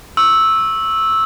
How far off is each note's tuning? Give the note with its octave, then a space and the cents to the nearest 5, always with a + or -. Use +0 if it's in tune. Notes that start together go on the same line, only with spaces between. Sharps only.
C#6 -15 E6 -10